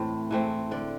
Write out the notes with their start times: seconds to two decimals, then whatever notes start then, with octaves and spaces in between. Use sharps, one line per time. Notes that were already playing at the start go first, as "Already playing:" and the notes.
Already playing: A2 E3 A3 C4
0.31 E3 A3 C4
0.71 D3 D5